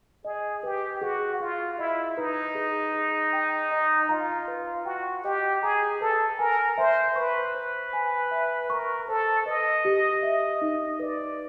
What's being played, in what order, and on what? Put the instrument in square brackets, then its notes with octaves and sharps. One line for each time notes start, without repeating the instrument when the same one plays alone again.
[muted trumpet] G#4 [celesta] D#5
[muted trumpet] G4 [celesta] B4
[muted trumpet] F#4 [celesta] G#4
[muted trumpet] F4 [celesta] G#4
[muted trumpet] E4 [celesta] D#5
[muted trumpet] D#4 [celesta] B4
[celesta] G#4
G#4
G5
D#5
[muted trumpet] F4 [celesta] A#5
[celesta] B4
[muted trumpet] F#4 [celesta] G5
[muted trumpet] G4 [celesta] D#5
[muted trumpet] G#4 [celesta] A#5
[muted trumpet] A4 [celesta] B4
[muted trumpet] A#4 [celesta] G#5
[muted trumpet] C5 [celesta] E5
[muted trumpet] B4 [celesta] C#6
[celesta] C5
G#5
E5
[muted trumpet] A#4 [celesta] C#6
[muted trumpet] A4 [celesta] C5
[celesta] B4 [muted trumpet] D#5
[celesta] G4
E5
D#4
[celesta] B4 [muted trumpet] D5